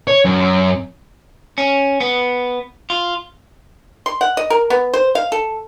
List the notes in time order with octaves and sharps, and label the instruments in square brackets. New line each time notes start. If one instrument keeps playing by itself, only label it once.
[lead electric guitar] C#5
F#2
[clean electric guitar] C#4
B3
F4
[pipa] C6
F#5
D#5
A#4
B3
C5
F5
A4